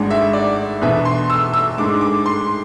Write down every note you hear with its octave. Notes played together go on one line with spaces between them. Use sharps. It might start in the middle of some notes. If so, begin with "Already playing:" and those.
Already playing: G#1 G#2 G#3 D4
E5
D5
E2 B2 B3 D4 E5
C6
E6
E6
G#2 G#3 D4 D6
D6
C6